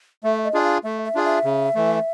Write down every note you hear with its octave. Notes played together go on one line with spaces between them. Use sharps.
A3 E5
D#5
D4 F4 G#4
F5
A3 E5
E5
D4 F4 G#4
E5
C#3
E3 A3